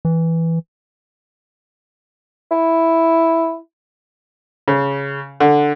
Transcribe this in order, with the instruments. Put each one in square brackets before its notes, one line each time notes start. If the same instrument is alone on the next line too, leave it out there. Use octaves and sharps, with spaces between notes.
[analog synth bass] E3
[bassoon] E4
[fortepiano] C#3
D3